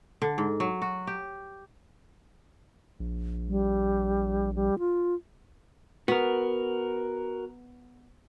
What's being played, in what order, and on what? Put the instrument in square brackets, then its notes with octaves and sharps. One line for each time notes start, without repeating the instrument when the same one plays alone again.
[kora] D3
G#2
F#3
F#4
G4
[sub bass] A#1
[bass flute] G3
G3
F4
[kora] B3 [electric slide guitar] F#4 A#4